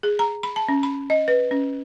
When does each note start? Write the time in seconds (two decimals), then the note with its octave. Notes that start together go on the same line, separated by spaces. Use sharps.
0.03 G#4
0.19 A#5
0.43 B5
0.56 A5
0.69 C#4
0.83 B5
1.10 D#5
1.28 B4
1.51 C#4